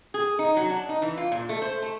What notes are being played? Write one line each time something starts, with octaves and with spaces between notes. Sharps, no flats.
G#4
D#4
F#3
D4
D#4
E3
F4
A#2
A3
C5
A3